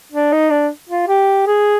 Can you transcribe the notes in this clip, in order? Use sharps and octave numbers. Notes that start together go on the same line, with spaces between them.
D4
D#4
D4
F4
G4
G#4